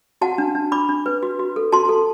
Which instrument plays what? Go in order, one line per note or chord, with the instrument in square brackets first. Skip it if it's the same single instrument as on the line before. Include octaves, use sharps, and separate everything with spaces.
[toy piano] F#4 F#5 A5
D4
D4
D4 B5 D6
D4
B4
F#4
F#4
A4
F#4 A5 C6
A4